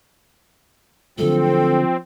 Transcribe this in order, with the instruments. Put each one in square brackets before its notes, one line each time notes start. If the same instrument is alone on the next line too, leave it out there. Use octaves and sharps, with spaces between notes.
[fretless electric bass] D3 F#3 A3 [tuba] F3 [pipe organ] C4 [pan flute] A4